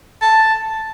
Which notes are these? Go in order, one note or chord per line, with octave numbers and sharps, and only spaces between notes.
A5